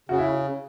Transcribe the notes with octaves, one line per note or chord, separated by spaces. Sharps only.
C#3 F#4
E4